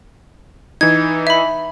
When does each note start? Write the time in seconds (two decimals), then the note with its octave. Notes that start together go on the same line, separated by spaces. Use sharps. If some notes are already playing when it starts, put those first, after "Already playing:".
0.81 E3 D#4 G#6
1.27 E5 B5